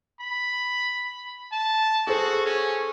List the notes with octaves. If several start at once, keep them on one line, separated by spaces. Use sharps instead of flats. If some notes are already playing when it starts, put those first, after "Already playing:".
B5
A5
F#4 G#4 A4 C5
C#4